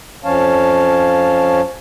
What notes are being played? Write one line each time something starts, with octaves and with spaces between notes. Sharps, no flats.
F2 F3 C#4 C#5 F5 A5